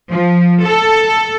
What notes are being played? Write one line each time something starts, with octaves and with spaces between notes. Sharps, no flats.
F3
A4